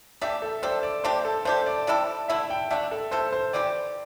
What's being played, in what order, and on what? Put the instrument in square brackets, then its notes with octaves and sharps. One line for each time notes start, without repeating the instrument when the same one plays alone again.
[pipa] E3 A3 D4 G4 [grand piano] E5
[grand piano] A4
[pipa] G3 D4 A4 [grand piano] C5
[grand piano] D5
[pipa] A3 D4 G4 [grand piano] C5
[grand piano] A4
[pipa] A3 D4 G4 [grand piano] C5
[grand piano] D5
[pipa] C3 G3 E4 A4
[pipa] D3 A3 E4 [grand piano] E5
[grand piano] G5
[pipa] D3 A3 D4 [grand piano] E5
[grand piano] A4
[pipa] C3 A3 E4 A4 [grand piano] C5
[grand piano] C5
[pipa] E3 C4 E4 G4 [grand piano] D5